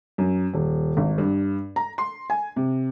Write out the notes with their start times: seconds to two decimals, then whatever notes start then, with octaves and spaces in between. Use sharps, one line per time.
0.18 F#2
0.54 D#1
0.97 G#1
1.18 G2
1.76 A#5
1.98 C6
2.30 G#5
2.56 C3